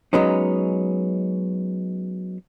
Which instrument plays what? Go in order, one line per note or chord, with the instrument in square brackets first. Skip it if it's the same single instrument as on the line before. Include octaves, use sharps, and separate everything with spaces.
[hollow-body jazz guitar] F#3 G#3 B3 C#4 D#4